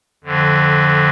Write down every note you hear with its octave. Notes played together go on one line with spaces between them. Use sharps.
F2 D3 F3